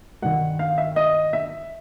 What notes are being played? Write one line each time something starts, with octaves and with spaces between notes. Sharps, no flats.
G2 D#3 F#5
F5
E5
D#5
E5